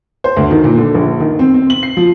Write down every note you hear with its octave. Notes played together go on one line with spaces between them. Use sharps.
C5
D2
D#3
A#2
D3
A#1
D#3
C4
C4
F#7
C7
F3